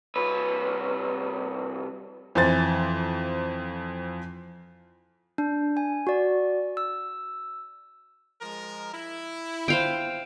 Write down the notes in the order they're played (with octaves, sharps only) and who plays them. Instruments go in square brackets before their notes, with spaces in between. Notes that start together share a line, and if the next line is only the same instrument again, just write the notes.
[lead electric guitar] C2 B4
[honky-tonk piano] F2 E3 C5 A6
[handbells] D4
G#5
F#4 D5
E6
[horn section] F3 G#3 A#4
E4
[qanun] C5 F5 G5